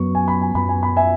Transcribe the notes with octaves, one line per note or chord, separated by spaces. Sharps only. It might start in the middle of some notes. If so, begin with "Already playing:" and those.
Already playing: F#2 F#3 B3 C#6
G#5
B5
G#5
F#2 F#3 B3 B5
G#5
B5
E5 G#5